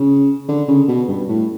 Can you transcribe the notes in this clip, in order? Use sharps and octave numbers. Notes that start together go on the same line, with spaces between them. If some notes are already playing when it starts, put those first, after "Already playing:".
Already playing: C#3
D3
C#3
B2
G2
A2